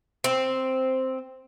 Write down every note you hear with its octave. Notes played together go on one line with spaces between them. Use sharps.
C4